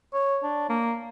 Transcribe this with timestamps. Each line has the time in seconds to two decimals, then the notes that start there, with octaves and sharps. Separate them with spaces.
0.13 C#5
0.43 D4
0.69 A#3